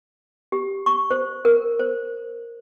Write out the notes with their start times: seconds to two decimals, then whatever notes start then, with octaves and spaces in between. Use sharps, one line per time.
0.52 G4
0.86 C#6
1.11 C5
1.45 A#4
1.79 C5